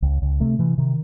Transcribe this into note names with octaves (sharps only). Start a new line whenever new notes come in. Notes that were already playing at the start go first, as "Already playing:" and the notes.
C#2
C#2
C3 A3
C3 E3
C3 D#3